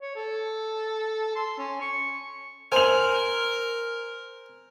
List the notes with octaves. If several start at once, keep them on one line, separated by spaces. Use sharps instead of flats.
C#5
A4
C6
C#4
C#6
A#4 C5 G#5 F7